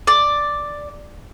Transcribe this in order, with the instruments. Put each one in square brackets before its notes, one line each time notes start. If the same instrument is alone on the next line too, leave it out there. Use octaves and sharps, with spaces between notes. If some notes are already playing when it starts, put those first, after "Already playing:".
[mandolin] D5